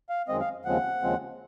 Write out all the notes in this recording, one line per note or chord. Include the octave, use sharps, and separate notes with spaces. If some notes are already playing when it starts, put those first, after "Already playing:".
F5
F#2 D#3 G#3 C4 D#5
F5
D#2 C#3 F3 G#3 C4 F#5
D#2 C#3 F3 G#3 C4